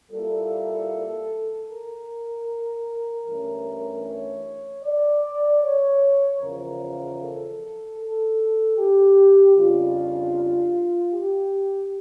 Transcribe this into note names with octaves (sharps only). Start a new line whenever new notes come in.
A#2 G3 A#3 E4 A4
A#4
G2 E3 A3 C#4
C#5
D5
C#5
E2 C#3 F3 A#4
A4
A4
G4
F2 C#3 G3 D4 F4
G4